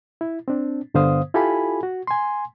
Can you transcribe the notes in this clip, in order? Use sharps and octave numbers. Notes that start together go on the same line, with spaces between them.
E4
C4 D4
G2 D3 B3 C5 F5 D#6
E4 F4 G4 A4 G#5 B5
F#4
G#5 C6